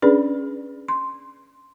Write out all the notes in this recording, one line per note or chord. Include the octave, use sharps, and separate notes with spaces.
C#4 D4 G#4 B4 D5
C6